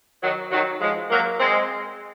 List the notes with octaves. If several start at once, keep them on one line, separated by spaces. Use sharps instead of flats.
D#3 F#3
D#3 F#3
F3 G#3
F#3 A#3
G#3 C4